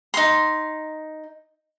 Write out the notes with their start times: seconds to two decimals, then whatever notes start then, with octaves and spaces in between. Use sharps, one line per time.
0.14 D#4 C6